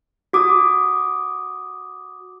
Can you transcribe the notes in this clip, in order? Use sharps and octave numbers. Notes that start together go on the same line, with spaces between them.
F#4 D6 D#6